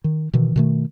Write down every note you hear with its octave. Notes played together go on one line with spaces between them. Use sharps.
D#3
B2 D#3 E3
B2 D#3 A3